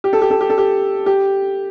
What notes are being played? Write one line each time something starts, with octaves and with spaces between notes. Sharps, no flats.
G4
A4
G4
A4
G4
A4
G4
G4